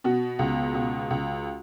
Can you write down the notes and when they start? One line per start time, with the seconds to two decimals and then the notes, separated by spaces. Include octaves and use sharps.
0.04 B2 F#4
0.39 C#2
0.74 B2
1.10 C#2